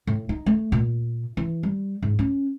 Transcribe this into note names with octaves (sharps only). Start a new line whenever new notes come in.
A2
D#4
A3
A#2
E3
G3
G#2
C#4